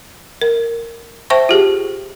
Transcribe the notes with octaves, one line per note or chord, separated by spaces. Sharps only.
A#4
C5 E5 G5 A5 C#6
F4 G4 G#4